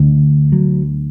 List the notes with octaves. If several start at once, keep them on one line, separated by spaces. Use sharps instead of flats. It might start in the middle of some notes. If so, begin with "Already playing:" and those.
Already playing: D2 D3
F#3